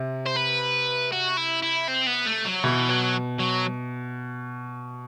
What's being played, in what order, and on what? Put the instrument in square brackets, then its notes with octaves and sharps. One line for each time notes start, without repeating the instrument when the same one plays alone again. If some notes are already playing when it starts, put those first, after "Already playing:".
Already playing: [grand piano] C3
[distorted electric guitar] C5
B4
F#4
E4
E4
C4
B3
A3
F#3
[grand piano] B2 [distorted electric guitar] E3
[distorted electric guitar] F#3
F#3